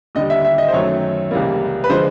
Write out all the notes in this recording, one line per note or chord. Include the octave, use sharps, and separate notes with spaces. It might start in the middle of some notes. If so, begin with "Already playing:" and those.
D#2 D3 G3 D#5
E5
E5
D#5
C5
F#2 D#3 F#3 A3 C#5
C#2 C3 E3 G3 A#3
B4
D3 F3 G#3 C5